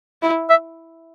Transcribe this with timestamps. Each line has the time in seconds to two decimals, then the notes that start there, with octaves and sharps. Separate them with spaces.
0.22 E4
0.50 E5